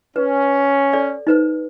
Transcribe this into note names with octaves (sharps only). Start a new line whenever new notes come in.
C#4 B4
A4 D5
D#4 B4 C5